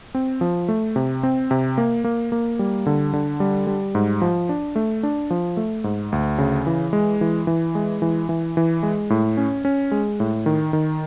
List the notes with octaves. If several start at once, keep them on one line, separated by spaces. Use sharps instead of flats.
C4
F3
A3
C3
C4
C3
A#3
A#3
A#3
G3
D3
D3
G3
G3
G#2
F3
D4
A3
D4
F3
A3
G#2
D2
C#3
E3
G#3
E3
E3
G#3
E3
E3
E3
G#3
A2
C#4
C#4
G#3
A2
D#3
D#3